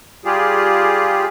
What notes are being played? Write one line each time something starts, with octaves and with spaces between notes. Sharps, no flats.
G3 F4 G4 G#4